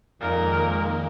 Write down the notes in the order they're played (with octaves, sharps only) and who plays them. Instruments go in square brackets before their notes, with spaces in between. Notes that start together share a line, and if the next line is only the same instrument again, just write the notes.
[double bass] F2 [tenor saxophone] A#2 [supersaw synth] D#3 G#3 A#3 [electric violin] A#4